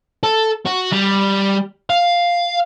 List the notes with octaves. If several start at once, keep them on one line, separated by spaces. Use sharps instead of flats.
A4
F#4
G3
F5